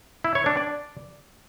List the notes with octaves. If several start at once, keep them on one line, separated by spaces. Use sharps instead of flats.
E4
C#5
D4
D5